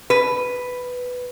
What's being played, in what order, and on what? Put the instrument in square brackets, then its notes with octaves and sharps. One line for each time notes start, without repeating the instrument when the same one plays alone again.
[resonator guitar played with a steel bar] B4